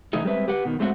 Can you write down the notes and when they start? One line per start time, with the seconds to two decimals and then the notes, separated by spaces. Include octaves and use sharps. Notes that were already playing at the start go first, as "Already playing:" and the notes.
0.13 C3 E3 A3 D#4 G#4
0.25 G3 G#3 C4 B4 E5
0.48 G4 B4 F#5
0.65 B2 D#3
0.79 A2 G#3 A3 C4 D4 F#4